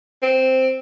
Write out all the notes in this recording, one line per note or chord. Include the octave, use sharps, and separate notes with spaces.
C4